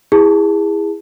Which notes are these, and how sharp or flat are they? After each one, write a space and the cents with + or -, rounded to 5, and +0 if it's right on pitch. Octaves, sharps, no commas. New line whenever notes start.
E4 +0 G#4 -25 A5 +0